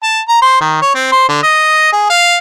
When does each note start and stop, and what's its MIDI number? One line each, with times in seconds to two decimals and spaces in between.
0.03 0.20 81
0.28 0.37 82
0.42 0.60 72
0.61 0.79 51
0.82 0.94 73
0.95 1.10 60
1.11 1.26 72
1.29 1.41 50
1.43 1.90 75
1.92 2.07 68
2.10 2.37 77